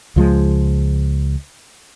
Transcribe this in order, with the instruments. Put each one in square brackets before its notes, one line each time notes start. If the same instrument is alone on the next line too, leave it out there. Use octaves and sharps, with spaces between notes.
[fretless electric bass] C#2 F3 G#3